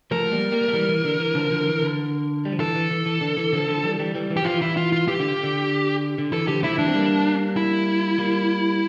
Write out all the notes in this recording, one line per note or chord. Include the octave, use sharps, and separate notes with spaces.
F3 A3 A#4
G3 A#3
G3 A#3
A3
E3 G3
E3
D3
E3
D3 F3
D3 F3
E3
D3
G3
F3
E3 A4
E3
E3
E3
D3
E3
D3 F3
D3 F3
E3 G3
E3 G3
E3 G3
E3
G4
F3 F4
E3
E4
F4
F4
E3 G4
D3
D3
D3
E3 A4
D3 F3 G4
F3 A3 E4
E3 G3 D4
C4
G3 A#3
E4
G3 A#3